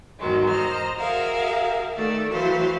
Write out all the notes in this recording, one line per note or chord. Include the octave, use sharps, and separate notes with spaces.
E2 G#2 D#3 F#3 G#3
C5 D#5 A#5 F6
F#4 G#4 A#4 E5 F5
D#3 A3 D5
E3 F#3 C5 F5